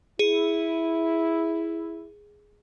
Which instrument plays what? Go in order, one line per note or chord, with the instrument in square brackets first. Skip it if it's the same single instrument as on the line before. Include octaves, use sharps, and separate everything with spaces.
[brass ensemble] E4 [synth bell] G#4